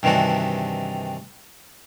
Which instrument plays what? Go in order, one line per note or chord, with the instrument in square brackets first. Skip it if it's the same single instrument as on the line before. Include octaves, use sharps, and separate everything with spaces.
[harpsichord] G2 C3 D#3 E3 D4 F#4